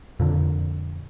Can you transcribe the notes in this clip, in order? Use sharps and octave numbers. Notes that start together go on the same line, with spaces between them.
F2 A#2 D3